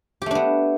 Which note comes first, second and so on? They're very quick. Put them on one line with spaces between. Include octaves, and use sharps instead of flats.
G4 A3 D4 B3